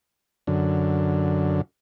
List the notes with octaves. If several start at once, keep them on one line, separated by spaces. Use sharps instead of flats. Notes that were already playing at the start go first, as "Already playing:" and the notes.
F#2 D3